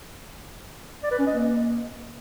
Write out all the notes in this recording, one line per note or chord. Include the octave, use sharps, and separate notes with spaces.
D5
B4
C#4
D#5
A#3